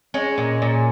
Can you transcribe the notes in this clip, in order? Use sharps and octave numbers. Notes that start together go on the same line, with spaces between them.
G#3 C#4
A#2
A#2